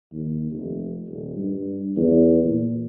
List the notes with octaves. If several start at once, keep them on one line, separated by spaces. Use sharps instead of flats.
D#2
F1
D#1
G2
E2
A#2